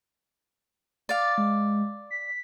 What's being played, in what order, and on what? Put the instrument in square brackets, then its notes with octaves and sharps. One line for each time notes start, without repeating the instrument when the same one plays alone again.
[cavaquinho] D5 F5 [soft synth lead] A6
[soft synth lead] G#3
B6